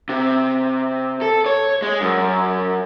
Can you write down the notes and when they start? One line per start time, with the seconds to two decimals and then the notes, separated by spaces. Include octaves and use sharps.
0.09 C3
1.22 A4
1.46 C#5
1.82 G#3
2.01 F#2